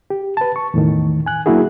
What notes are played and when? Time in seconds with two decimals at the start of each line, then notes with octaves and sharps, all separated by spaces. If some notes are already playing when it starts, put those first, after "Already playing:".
0.10 G4
0.37 B4 A5
0.56 C#6
0.74 E2 A2 D#3
1.26 G#5 F#6
1.46 F#3 A#3 D4 E4 F#4 G#4